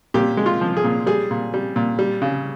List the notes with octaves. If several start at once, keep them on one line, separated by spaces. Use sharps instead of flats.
A#2 G4
G#3
F4
F3
G#4
A#2
G3 G#4
A#2
G3
A#2
G3
C#3